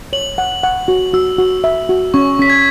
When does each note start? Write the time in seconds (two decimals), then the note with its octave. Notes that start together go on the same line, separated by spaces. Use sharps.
0.13 C#5 F#7
0.38 F#5
0.63 F#5
0.88 F#4
1.13 F#4 E6
1.38 F#4
1.64 E5
1.89 F#4
2.14 C#4 C#6
2.39 C#4 B6
2.50 G#6